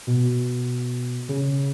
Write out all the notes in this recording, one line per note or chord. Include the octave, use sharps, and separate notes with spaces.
B2
C#3